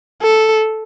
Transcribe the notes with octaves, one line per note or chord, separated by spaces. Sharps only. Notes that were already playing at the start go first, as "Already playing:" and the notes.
A4